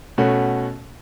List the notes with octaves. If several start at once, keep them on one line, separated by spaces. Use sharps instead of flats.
B2 A3 C#4 F#4